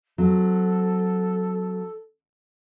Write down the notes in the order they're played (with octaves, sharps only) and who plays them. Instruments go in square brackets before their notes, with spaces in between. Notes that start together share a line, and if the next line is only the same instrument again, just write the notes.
[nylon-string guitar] F#3 C4 [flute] A4